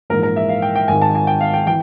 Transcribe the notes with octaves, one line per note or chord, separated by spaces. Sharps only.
A#1 G#2 E3 A#4
A#4
E5
F5
G5
G5
G#1 G#2 D#3 G#5
A5
G#5
G5
F5
G5
E3 G5